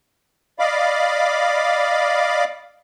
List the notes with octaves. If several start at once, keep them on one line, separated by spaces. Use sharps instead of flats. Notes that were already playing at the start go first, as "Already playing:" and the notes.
D5 D#5 F5 B5 D6